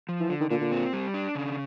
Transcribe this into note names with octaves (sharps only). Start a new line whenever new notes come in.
F3
E3
D3 F3
D#3
A#2 D3
A#2
C4
G3
D4
C#3